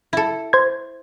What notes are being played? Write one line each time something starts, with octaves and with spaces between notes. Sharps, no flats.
E4 A4
C5 G#6